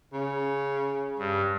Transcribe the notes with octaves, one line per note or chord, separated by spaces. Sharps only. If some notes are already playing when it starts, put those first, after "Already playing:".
C#3
G2